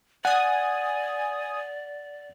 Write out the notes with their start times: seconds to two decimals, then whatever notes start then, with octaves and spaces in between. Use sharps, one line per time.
0.25 D5 F#5 G#5 D#6